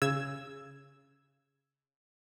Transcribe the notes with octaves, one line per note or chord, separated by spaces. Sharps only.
C#3 E6 G#6